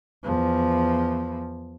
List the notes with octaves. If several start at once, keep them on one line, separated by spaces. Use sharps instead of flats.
E2 F3